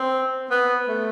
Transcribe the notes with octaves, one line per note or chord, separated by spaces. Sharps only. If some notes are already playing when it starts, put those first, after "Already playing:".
Already playing: C4
B3
A3